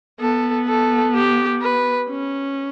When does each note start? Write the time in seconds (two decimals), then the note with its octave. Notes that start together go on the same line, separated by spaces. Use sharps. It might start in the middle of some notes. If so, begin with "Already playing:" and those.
0.20 B3 A4
0.68 A4
1.15 G4
1.62 B4
2.09 C#4